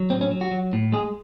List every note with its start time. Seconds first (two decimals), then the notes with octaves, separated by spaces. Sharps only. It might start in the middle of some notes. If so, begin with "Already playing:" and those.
Already playing: F#3
0.10 A2 C4
0.21 C#4
0.31 F#3
0.41 F#4
0.51 F#3
0.73 A2
0.92 G#3 G#4